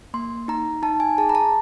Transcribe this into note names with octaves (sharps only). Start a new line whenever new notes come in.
A#3 C6
D#4 A#5
D#4 A5
G#5
G#4 A5
A#5
A5